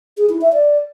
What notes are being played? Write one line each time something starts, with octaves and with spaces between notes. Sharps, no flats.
G#4
E4
E5
D5